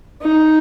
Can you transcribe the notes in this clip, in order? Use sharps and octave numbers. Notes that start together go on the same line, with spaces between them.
D#4